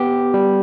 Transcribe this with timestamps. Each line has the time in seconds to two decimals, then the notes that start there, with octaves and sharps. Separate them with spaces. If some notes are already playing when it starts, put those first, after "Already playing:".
Already playing: B3 G4
0.34 G3